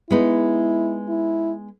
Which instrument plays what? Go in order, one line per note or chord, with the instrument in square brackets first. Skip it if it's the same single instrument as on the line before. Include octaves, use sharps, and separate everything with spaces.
[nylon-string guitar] G#3 B3 D#4 [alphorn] E4
[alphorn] E4